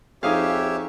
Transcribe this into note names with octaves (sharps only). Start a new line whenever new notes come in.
F2 D#4 G4 G#4 C#5 E5 F5